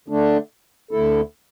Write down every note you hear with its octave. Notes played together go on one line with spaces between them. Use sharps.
D3 A3 D4
D2 D3 A3 E4 A4